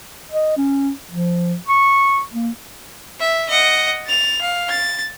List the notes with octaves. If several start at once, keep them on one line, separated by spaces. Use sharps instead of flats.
D#5
C#4
F3
C#6
A#3
E5
D#5 F#5
A6 F7
F5
A6